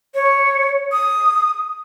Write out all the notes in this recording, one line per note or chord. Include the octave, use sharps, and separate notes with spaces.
C#5
D#6